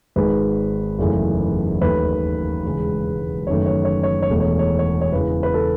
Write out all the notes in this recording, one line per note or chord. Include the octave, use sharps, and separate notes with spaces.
G#1 G#2 D#3 G#3 B4
F#1 E2 C#3 E3 A3
D#2 D#3 A3 B4
E1 E2 C#3 G#3
F#1 F#2 D#3 A3 C#5
C#5
C#5
C#5
C#5
E1 E2 B2 A3
C#5
C#5
C#5
C#5
E1 E2 C#3 E3 B4
B4
A4